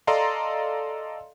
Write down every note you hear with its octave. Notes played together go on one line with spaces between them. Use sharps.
A4 D5 D#5 F5 A#5 C6